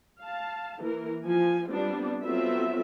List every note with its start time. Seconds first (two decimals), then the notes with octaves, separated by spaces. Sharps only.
0.22 F5 A5
0.80 E3 A#3 A#4
1.25 F3 G#5
1.68 G3 B3 C4 D4 F4
2.24 F#3 B3 C4 F4 A4 E5